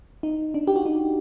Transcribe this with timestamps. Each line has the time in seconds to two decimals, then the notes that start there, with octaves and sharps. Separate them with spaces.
0.23 D#4
0.54 D4
0.67 G4
0.76 F#4
0.85 D#4